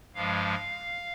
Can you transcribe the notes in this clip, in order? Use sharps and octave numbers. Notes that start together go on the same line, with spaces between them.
G2 F3 G#3 F5